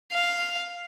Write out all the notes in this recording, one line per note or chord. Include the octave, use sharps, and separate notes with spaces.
F5